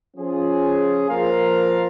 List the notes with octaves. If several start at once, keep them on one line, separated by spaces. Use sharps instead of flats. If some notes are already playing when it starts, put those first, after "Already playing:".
F3 C#4 F4 G#4
F3 A#3 F4 A#4 F5